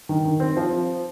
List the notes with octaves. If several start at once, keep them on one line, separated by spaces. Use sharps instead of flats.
D#3
D#3
C4
F3